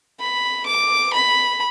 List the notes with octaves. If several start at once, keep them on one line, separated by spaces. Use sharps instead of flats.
B5
D6
B5